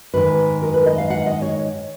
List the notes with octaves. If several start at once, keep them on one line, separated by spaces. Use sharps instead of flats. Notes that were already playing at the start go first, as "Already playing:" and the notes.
G#2 D#3 G#3 B4
A#4
B4
D#5
F5
F#5
D#5
C#5